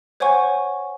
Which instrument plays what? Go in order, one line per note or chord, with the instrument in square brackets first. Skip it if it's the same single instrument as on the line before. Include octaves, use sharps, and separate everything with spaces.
[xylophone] C5 C#5 F#5 G#5 C#6